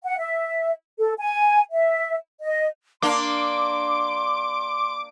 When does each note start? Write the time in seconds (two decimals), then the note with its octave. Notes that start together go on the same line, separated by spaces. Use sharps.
0.03 F#5
0.18 E5
0.99 A4
1.18 G#5
1.71 E5
2.42 D#5
3.02 A#3 D4 C6 D6